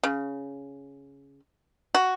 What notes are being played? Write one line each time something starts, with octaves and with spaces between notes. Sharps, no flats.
C#3
F#4